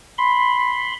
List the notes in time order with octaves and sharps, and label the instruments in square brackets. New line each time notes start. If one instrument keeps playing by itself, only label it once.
[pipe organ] B5 C6